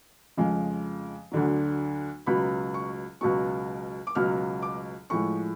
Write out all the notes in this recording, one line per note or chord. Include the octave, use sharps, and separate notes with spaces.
F2 C#3 F3 G#3
D2 D3 F#3
C#2 B2 F#3 B5
C#6
C#2 B2 F#3 C#6
D6
C#2 B2 F#3 F6
D6
A2 F3 G#3 C#6